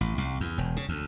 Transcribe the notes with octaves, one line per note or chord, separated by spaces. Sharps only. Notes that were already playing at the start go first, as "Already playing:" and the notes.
A1
C2
E2
E1
C#3
D2